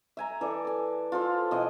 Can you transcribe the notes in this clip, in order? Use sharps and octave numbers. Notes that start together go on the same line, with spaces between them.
E5 G#5 A#5
E3 A4 D5
G#5 A5
F4 A4 C5
B2 E3 D#5 C6